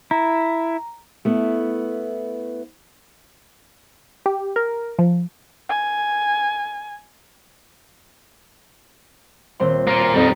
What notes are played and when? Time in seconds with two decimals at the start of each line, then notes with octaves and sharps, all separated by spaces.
0.11 E4 A#5
1.25 A3 B3 E4
4.26 G4
4.56 A#4
4.99 F3
5.69 G#5
9.60 D#1 C4 C6
9.87 A#3 F4
10.14 F2 G3 D#4